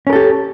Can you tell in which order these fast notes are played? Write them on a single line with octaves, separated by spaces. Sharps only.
C#4 A#4 A4 G4